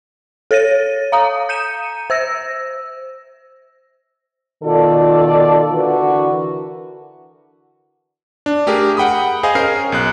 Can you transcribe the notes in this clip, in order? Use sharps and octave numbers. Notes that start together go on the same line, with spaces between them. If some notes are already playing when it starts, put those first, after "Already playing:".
A4 C#5 A6 A#6 D#7
F5 A#5 D#6
G6 C#7 D#7 E7
C5 E6 A#6
B2 D#3 F4 A4 D5
D3 E3 F#4 A#4 B4
D4
A3 G4 G#4 A#4
F#5 G5 B5 D#6
G#4 C5 D#5 F5 G#5
C#4 A#4 C7
B1 F#6